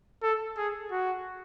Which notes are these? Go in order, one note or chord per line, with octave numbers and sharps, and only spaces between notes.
A4
G#4
F#4